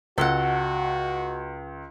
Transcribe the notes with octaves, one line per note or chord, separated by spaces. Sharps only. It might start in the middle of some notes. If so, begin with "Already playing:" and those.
C#2 F#4 A4 D#5 F#5